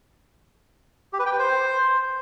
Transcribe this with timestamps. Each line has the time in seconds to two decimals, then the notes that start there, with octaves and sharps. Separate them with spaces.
1.13 G4
1.19 B4
1.26 G5
1.32 B4
1.39 C5